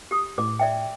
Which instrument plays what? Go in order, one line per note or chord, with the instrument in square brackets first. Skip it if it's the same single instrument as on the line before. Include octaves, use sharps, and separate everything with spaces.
[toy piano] G4 D#6
[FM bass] A2 [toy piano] D6
[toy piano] D5 E5 G5